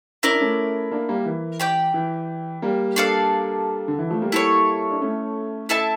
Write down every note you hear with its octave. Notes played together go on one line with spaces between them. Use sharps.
C#4 E4 A#4 D5
D4
A3 C#4
A#3 D4
G3 A#3
E3
G4 D5 G5
E3
G3 A#3
D4 A4 D5 F5
D3
E3
F3 A3
G3 A#3
E4 A4 C#5
D4
A3 C#4
E4 A4 E5 A5